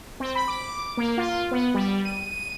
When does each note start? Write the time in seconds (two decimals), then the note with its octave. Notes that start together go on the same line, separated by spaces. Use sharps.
0.20 C4
0.35 B5
0.48 D6
0.97 A#3
1.17 F4
1.51 B3
1.74 G3
2.05 D#7